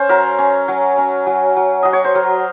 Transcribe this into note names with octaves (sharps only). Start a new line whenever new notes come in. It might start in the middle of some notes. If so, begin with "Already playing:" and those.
Already playing: C#4 C5
F#3 A#4
C#4
F#3
C#4
F#3
F#3
F#3 D#5
C#5
C5
F#3 A#4